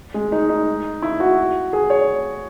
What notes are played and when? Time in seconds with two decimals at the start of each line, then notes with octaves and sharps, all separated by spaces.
0.14 G#3
0.32 D#4
0.49 D#4
1.02 E4
1.20 F#4
1.73 G#4
1.90 C#5